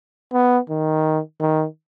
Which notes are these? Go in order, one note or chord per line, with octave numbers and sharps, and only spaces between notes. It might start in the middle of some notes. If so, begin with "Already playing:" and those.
B3
D#3
D#3